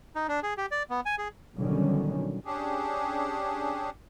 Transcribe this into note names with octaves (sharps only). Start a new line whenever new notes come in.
D#4
D4
G#4
G4
D5
B3
G#5
G#4
B2 D3 D#3 F#3 G3 C#4
C#4 D4 G4 G#4